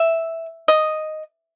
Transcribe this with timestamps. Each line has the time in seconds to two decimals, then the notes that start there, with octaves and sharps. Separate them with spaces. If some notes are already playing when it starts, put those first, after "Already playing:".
Already playing: E5
0.68 D#5